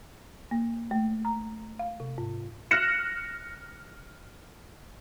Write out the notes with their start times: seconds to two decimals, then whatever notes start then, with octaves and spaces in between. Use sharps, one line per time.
0.51 A#3
0.91 A3
1.25 A#5
1.79 F5
2.00 C3
2.18 G#2
2.71 F6 F#6 A#6 C#7 E7